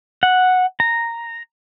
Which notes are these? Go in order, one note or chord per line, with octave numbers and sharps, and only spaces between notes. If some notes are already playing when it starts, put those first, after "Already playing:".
F#5
A#5